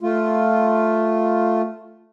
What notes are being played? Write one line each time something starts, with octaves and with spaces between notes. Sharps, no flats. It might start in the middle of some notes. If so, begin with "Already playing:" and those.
A3 F4